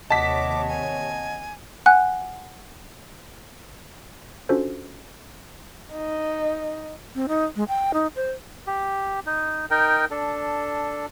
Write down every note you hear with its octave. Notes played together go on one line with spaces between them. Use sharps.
D#2 C3 C#5 D#5 F#5 A5 D6 B6
G#5
F#5 G#5 F#6
C#4 D4 F4 F#4 A4 C5
D#4
C4
D#4
G#3
G5
D#4
C5
G4
D#4
D#4 A#4 G5
D4 A4